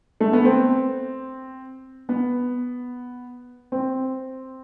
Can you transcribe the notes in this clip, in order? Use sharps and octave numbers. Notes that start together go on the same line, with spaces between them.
A3
B3
C4
B3
C4